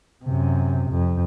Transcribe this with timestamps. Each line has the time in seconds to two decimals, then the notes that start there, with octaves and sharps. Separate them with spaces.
0.24 F#2 C3
0.90 F2